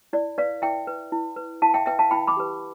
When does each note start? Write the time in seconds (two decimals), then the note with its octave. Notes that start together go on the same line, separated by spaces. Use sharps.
0.13 E4 D5
0.38 B4 D5 F5
0.62 E4 E5 G5
0.87 B4
1.12 E4
1.36 B4
1.62 E4 F5 A5
1.74 E5 G5
1.86 B4 E5 G5
1.99 F5 A5
2.11 E4 G5 B5
2.27 B5 D6
2.37 G4 B4